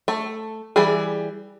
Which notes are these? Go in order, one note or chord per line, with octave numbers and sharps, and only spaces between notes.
A3
E3 G3 G#4